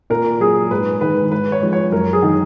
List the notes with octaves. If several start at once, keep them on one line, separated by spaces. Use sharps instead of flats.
A#2 A#4
F#3 G#4
G#2 B4
D#3 G#3 B4
G#2 B4
C#5
F3 G#3
C#5
F#2 A#4
G#4
D#3 G#3